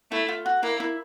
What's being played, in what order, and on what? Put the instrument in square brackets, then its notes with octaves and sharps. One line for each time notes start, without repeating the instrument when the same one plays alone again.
[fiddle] A3 [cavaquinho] E4
[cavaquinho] F4
F#4
[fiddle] A#3 [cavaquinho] E4
[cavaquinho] E4